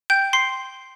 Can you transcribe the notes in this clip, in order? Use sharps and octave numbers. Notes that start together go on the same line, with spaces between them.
G5 G6
C6 C7